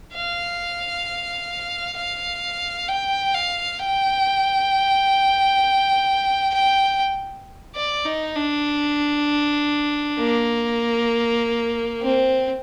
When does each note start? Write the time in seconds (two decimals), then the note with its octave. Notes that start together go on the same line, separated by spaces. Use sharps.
0.14 F5
1.97 F5
2.88 G5
3.35 F5
3.79 G5
6.54 G5
7.76 D5
8.05 D#4
8.36 D4
10.19 A#3
12.01 C4